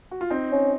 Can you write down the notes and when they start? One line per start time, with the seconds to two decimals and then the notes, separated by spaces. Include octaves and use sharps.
0.11 F#4
0.21 F4
0.30 C4 D#4
0.52 C#4